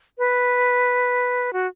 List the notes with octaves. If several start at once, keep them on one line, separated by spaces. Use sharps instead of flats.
B4
F#4